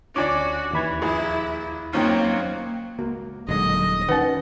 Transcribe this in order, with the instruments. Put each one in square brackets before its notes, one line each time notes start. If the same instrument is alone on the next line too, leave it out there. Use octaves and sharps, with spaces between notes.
[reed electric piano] D2 G#5 D6 [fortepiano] C#4 D4 D5 [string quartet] F#4
[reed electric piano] D#2 B5 G#6 [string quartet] E3
[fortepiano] A#1 G#4 [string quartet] E4
[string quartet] F#2 F#3 C4 [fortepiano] D#3 C#4 F4 [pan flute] A#3
[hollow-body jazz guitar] C#2 A#3 F#4
[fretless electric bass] D#1 D#2 G#3 [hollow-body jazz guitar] D3 F#3 [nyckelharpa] D#5
[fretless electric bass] D#3 F3 F#3 [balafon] C#4 B4 [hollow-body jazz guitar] F#5